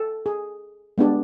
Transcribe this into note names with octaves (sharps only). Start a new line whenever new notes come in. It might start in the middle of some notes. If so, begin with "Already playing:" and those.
Already playing: A4
G#4
G#3 B3 D4 G4